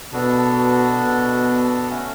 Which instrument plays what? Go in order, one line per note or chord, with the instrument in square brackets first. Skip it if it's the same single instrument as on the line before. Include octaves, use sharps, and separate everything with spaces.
[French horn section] B2 [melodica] B3 D4 F#4 A4
[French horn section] B2
[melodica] A3 C#4 F#4